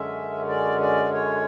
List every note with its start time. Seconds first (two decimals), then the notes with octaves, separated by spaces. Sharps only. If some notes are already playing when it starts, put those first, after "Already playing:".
Already playing: F#2 D3 G#3 C#4 E5
0.49 D5
0.81 D5
1.13 C#5